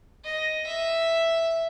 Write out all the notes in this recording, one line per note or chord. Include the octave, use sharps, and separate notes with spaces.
D#5
E5